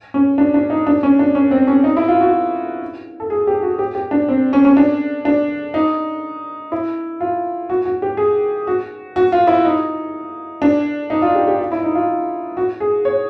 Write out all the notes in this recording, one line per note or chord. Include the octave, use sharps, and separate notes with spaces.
C#4
D4
D4
D#4
D4
C#4
D4
C#4
C4
C#4
D#4
E4
F4
F#4
A4
G#4
G4
F#4
G4
G4
D4
C4
C#4
C#4
D4
D4
D#4
E4
F4
F#4
F#4
G4
G#4
F#4
F#4
F4
E4
D#4
D4
D#4
F4
G4
G4
F4
E4
D#4
F4
F#4
G#4
C#5